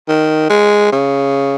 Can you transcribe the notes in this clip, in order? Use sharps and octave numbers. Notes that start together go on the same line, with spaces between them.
D#3
G#3
C#3